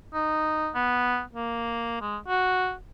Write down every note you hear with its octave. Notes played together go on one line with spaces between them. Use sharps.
D#4
B3
A#3
G#3
F#4